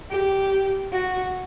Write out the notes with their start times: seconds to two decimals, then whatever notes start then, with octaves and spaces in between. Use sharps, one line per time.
0.11 G4
0.93 F#4